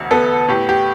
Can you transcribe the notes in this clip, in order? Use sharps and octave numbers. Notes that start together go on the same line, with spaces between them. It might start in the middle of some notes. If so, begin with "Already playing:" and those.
Already playing: E1 D2
B3 A4
A2 G4
G4